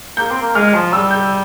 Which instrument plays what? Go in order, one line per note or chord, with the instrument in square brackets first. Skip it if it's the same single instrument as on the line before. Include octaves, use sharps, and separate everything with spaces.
[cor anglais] A#3 [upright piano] G6
[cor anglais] C4
A#3
[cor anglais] G#3 [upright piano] F6
[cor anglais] F3
[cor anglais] G3 [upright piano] E6
[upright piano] G6